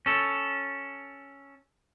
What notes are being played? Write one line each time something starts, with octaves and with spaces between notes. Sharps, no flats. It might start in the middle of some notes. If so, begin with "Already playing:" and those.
C#4 A4